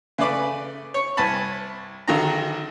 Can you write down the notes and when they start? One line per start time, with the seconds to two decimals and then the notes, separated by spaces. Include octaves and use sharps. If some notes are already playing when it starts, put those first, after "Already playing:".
0.18 C#3 A3 B4 D5 B5
0.94 C#5
1.17 C2 G#5 A5 B5
2.08 A#1 D3 D#3 F#3 A#5